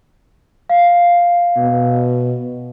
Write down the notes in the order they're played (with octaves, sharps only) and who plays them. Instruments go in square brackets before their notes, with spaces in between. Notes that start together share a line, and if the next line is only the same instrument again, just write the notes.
[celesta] F5
[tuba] B2